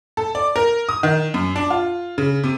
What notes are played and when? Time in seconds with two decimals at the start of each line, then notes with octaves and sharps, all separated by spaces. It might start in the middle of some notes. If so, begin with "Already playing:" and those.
0.17 A4
0.35 D5
0.56 A#4
0.89 D#6
1.03 D#3
1.34 F#2
1.56 D4
1.70 F4
2.18 C#3
2.44 C3